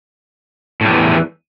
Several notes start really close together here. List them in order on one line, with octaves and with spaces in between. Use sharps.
A2 G3 E2 E3